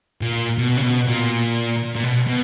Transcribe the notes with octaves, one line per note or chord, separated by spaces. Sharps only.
A#2
B2
C#3
B2
A#2
A#2
B2
B2